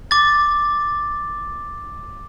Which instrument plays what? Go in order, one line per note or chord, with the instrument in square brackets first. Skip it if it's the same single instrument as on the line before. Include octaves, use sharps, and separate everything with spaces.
[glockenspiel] D6 A6